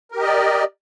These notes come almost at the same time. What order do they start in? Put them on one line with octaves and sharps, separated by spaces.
A#4 G4 D#5 D5